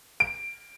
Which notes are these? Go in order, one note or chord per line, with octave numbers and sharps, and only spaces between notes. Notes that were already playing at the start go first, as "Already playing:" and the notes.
D7